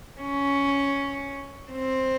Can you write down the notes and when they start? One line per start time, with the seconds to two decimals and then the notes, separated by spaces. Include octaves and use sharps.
0.22 C#4
1.72 C4